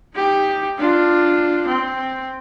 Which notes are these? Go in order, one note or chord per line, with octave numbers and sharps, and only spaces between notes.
D#4 G4
D4 F4
C4